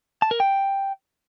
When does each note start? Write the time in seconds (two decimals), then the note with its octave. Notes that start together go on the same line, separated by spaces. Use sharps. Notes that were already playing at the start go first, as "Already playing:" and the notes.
0.22 A5
0.31 A#4
0.40 G5